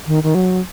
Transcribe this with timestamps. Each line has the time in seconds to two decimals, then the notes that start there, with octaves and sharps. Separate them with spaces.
0.07 D#3
0.23 D#3
0.35 F#3